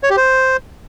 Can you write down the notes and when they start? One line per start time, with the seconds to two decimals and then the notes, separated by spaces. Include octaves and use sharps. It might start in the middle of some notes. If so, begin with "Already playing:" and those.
0.03 C#5
0.10 G4
0.17 C5